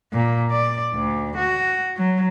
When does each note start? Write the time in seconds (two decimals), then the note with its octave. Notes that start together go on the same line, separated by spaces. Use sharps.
0.13 A#2
0.51 D5
0.95 D2
1.37 F#4
1.97 F#3